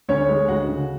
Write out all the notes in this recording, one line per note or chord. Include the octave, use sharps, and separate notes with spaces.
D2 C#4 C#5
G#3
D2 F#4 F#5
C#3